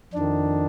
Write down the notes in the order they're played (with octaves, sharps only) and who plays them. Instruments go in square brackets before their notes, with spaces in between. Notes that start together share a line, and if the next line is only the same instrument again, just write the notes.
[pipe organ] F2 D#3 D4